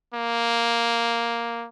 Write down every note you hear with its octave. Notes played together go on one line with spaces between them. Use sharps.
A#3